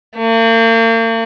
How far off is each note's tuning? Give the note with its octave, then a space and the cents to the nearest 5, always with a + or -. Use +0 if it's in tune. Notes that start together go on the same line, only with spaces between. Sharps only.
A#3 -40